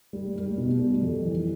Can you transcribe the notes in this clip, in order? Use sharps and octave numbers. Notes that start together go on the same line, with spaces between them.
G3
G3
B2
G3
F2
E3